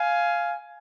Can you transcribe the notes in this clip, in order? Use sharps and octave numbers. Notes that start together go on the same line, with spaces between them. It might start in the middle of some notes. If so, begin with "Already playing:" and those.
Already playing: F5 G#5